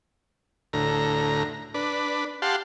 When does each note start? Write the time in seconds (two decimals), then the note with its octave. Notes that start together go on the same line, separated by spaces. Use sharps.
0.73 D2 A2 A#5
1.74 D4 B4
2.42 G4 F5 F#5 A5 C6